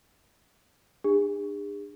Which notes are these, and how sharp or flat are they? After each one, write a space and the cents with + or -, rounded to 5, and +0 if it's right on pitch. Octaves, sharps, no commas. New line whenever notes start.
D4 +30 G#4 -40